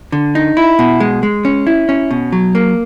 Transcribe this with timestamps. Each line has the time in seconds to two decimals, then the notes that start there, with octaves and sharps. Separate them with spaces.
0.12 D3
0.35 D#4
0.57 E4
0.79 B2
1.00 G#3
1.23 G#3
1.45 C#4
1.67 E4
1.89 C#4
2.11 B2
2.32 F#3
2.55 A#3